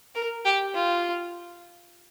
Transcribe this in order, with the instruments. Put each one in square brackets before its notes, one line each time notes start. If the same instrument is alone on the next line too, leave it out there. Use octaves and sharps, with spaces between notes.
[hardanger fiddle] A#4
G4
F4